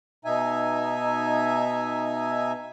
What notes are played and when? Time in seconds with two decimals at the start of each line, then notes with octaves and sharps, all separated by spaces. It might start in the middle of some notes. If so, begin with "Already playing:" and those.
0.25 B2 D#4 E5 G#5